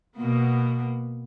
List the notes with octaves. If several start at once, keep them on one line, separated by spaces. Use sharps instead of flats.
B2 A#3 B3